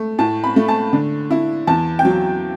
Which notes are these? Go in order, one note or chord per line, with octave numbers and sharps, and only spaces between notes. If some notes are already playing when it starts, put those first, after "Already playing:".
Already playing: A3
A2 A5
B5
A3
A5
D3
E4
E2 A5
G5
F#3